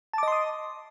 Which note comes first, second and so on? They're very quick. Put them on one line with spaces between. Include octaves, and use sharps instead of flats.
A5 D6 D#5 C6 D#6